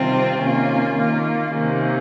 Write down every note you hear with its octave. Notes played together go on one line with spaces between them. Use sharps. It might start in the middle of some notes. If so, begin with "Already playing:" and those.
Already playing: C3 D#3 G3 C4 F4
C3 D#3 A#3 C#4 F4
D#3 A#3 F4
C3 D#3 A#3 C#4